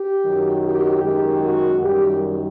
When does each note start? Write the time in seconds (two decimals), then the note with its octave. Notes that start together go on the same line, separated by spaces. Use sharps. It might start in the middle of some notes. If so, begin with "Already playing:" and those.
Already playing: G4
0.24 F#2 D#3 F#3
0.64 G4
1.03 F#2 D#3 G#3 G4
1.42 F#4
1.82 F#2 D#3 G3 G4